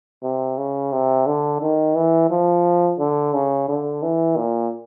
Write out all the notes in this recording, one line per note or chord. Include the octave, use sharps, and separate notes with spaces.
C3
C#3
C3
D3
D#3
E3
F3
D3
C#3
D3
E3
A#2